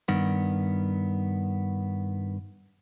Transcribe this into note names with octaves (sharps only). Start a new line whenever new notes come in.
G2 D#3 B3